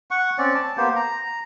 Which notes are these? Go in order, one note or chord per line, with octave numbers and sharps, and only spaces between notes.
F#5 C#6
C4 C#4 D5
A5
A#3 B3 G4 C5
A#5